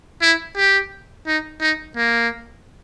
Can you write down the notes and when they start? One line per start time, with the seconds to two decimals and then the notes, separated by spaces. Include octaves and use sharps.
0.22 E4
0.57 G4
1.27 D#4
1.61 D#4
1.97 A#3